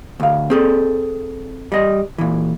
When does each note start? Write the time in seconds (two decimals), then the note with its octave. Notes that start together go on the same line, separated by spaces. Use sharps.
0.20 D2 F5
0.50 C4 G#4 A4
1.72 G3 D#5
2.18 A#2 E3